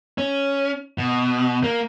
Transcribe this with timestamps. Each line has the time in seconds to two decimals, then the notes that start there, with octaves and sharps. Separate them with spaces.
0.18 C#4
0.98 B2
1.64 A#3